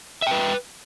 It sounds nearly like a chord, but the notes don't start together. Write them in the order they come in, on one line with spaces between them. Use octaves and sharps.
E5 G5 B4